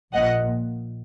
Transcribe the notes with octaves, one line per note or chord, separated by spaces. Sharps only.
A#1 A#2 D#5 F#5